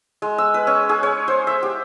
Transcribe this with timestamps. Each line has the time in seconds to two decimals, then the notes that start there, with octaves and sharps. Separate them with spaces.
0.22 G#3
0.38 E6
0.54 B4
0.67 C#4
0.89 G#4
1.03 C#5
1.28 C5
1.47 E5
1.63 G4